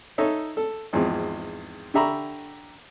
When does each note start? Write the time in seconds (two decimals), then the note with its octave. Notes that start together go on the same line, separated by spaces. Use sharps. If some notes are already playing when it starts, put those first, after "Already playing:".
0.18 D#4 A4 C#5 E5
0.57 A4
0.93 G#1 E2 F3 G#3
1.94 D3 G4 E5 A#5 B5 C#6